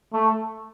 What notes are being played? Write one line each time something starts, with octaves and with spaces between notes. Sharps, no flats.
A3